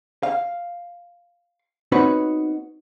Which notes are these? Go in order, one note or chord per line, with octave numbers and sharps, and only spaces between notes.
F5
B3 C4 D#4 F#4 B4 C#5